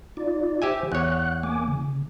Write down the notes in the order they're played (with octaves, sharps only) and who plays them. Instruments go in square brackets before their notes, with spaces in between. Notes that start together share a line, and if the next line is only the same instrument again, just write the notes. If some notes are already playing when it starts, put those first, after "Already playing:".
[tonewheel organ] D#4 F4 D5
[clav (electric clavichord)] G4 E5 G#5 [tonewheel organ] C5
[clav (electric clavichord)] E2 C#5 [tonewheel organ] F#5 F#6
[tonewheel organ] A#3 G#5 D6
C#3